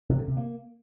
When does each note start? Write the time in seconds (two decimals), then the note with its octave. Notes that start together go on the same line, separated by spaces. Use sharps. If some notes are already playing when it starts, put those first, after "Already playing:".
0.09 C3
0.18 D3
0.28 C3
0.37 A#3